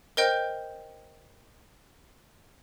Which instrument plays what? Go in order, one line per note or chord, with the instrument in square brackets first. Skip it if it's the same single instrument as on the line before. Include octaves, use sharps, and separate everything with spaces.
[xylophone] A#4 C5 D#5 G5 G6